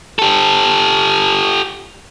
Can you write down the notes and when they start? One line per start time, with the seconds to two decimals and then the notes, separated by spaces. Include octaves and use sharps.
0.19 G4 A4